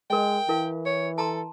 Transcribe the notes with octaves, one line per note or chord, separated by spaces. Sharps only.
G#3 A#4 D#5 G5
E3 E4 A#4 F5
C#5
A4 A5 A#5 C6